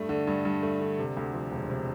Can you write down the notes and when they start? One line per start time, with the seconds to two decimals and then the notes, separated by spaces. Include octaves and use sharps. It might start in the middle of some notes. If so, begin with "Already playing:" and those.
Already playing: G2 A3
0.09 D3
0.27 G2
0.45 G2
0.63 A3
0.81 D3
0.99 C3
1.17 D2
1.34 F3
1.52 E1
1.70 C3